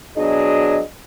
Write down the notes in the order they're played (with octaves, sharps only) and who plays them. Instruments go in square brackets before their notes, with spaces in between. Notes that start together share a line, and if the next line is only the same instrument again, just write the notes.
[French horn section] B2 F#3 D4 G#4 D#5